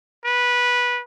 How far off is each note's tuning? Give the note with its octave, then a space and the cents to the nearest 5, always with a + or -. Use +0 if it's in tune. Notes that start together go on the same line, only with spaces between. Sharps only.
B4 -15